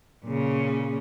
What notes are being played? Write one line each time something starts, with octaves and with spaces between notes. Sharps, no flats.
A#2 C#3